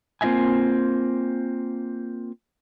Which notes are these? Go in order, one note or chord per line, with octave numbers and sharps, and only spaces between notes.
A#3 C4 F4 D#5 E5 G#5